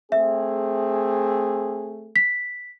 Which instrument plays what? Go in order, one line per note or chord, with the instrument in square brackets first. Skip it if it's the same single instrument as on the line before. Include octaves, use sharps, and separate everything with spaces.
[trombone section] A3 C4 G#4 [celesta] E5
[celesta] B6